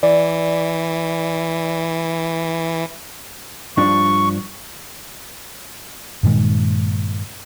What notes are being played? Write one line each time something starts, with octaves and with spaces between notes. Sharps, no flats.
E3 D5
G2 F3 D4 C#6
G2 A#2 D#3 G#3